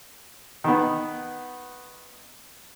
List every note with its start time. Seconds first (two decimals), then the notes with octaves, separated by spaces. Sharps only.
0.64 D#3 B3